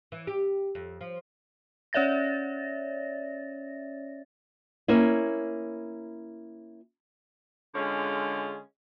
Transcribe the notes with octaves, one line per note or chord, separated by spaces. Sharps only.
E3
G4
F2
F3
C#4 C#5 D5 E5 A6 A#6
A#3 C#4 E4
D3 G#3 C#4 F4 G#4